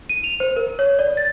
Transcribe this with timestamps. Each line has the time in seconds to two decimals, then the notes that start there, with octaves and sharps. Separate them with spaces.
0.09 D#7
0.24 F7
0.40 C5
0.56 A#4
0.79 C#5
0.99 D5
1.17 A6